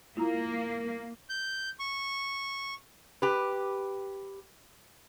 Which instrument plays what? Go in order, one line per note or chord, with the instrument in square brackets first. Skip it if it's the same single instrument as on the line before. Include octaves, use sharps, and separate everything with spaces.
[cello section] A#3 [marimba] E4 F4 A#5
[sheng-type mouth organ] G6
C#6
[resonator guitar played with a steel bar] G4 B4